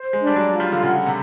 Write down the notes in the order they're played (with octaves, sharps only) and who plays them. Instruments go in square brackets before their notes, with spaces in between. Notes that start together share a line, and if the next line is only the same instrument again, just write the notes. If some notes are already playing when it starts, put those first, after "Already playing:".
Already playing: [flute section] C5
[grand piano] G#3
[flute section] D4
[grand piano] G3
F#3
[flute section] F4
[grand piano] G3
D3
[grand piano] C#3 [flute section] F#5
[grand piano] C3